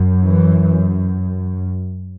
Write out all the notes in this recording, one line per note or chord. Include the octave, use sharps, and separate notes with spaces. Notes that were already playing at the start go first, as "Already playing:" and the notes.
Already playing: F#2
E3